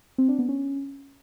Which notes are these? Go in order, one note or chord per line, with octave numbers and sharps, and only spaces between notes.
C4
D4
B3
C#4